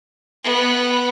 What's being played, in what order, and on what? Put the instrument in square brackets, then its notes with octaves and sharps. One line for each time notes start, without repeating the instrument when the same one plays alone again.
[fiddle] B3